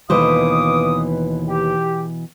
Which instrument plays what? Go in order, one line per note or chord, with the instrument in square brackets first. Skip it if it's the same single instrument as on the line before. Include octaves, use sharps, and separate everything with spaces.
[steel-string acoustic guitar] D#2 B4 C5 [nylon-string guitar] B2 E3 [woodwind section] F4 D6 D#6
[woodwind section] G4